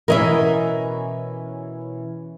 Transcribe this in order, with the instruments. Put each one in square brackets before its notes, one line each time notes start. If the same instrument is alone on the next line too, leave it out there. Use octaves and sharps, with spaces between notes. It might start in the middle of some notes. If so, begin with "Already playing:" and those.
[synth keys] B2 E3 C#4 [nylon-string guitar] A#4 D#5 E5